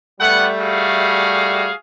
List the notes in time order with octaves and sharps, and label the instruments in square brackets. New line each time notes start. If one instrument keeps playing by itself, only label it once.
[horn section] G3 A3 [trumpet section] B3 F#5
[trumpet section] F#4 G#4 F5